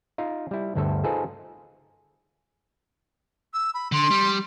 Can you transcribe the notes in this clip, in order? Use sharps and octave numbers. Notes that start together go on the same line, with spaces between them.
D#4 F4 F5
G3 E4
G1 D2 G2 G3 A4 E5
D#4 F4 G#4 A4 B4 C5
E6
B5
D3 C6
G3